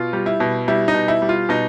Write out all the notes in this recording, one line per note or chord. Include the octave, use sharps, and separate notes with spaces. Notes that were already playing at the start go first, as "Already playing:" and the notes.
Already playing: B2 F4
G3
E4
B2
G3 E4
D#4
B2
E4
G3
F4
B2 D#4